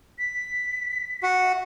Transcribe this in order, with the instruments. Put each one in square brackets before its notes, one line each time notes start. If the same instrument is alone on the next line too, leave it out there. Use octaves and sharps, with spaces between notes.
[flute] B6
[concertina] F#4
[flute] E5